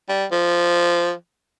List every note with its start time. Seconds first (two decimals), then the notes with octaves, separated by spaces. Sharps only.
0.09 G3
0.32 F3